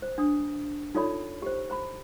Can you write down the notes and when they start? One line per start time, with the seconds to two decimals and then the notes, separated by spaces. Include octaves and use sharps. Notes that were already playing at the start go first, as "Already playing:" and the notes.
0.02 C5
0.18 D4 D#6
0.95 D#4 F4 A4 C#5 D5 B5
1.42 G4 C5
1.70 C5 A#5 B5